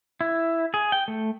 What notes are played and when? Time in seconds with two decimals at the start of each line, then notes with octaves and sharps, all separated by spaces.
0.21 E4
0.74 G#4
0.92 G5
1.08 A3